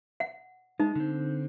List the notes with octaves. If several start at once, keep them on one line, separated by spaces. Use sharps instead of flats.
F#5
G#3 D#4
D3 C4